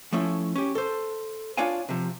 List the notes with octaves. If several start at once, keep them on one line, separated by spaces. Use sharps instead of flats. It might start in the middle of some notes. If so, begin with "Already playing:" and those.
F3 A3 C#4 E4
C#4 G4
A4 C5
D4 F4 C#5 D5 F5 G#5
C3 F3